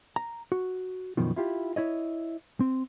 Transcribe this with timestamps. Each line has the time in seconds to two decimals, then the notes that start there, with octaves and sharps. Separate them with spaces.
0.16 A#5
0.52 F#4
1.17 F#2 B2 D#3 F3
1.36 E4 F4 G4
1.76 E4 C#5 D#5
2.61 C4